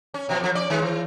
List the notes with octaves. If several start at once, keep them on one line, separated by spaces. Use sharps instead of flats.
C#4
B2 F3
F2 F3
C#4 D5
D#3 G#3
E3